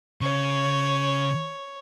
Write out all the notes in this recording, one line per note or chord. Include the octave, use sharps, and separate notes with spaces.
C#3 C#5